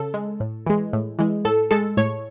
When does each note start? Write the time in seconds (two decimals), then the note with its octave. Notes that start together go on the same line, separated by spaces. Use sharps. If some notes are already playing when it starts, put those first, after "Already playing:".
Already playing: C#3 A4
0.14 G#3
0.40 A2
0.66 E3 G#3
0.93 A2
1.19 E3 G#3
1.45 A2 A4
1.71 G#3 A4
1.97 A2 C#5